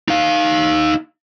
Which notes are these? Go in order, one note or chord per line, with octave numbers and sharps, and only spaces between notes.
D#4 F5